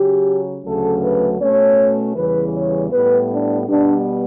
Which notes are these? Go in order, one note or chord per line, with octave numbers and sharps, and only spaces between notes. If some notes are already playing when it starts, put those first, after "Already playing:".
Already playing: C#3 F#3 C#4 G4
D2 C#3 F#3 A3 C#4 A4
B4
B2 A3 C#4 C#5
E2 C#3 E3 G3 B4
C#5
A2 G3 B3 B4
D4
B2 G3 B3 D4